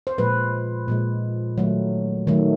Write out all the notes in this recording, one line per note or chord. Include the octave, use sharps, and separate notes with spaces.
C5
A#2 F3 G#3 B4
A#2 F3 G#3
D#3 F#3 A3
D#3 F#3 A3